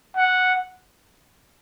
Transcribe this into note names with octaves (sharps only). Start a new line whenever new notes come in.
F#5